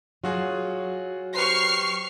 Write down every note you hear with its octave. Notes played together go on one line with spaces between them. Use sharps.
F#3 F4 F#4 G#4
G4 B4 C5 C#6 F6 C7